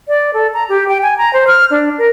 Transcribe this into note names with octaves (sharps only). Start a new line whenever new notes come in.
D5
A4
A#5
G4
G5
G#5
A#5
C5
F6
D4
A#4